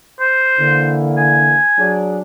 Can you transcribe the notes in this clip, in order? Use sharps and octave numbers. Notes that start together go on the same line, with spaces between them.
C5
D3 E3 A#3
G#5
F#3 D4 G#4